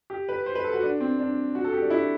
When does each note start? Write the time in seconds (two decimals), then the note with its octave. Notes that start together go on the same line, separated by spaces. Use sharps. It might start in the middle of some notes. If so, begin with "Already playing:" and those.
0.10 G4
0.29 B4
0.46 C5
0.55 B4
0.64 A4
0.73 F#4
0.83 D4
1.00 C4
1.19 D4
1.55 F#4
1.64 A4
1.73 G4
1.82 D4
1.90 E4